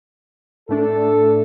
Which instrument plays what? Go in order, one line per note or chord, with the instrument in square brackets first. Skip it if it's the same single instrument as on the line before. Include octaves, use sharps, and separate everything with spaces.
[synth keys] A2 A3 D4 [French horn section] A4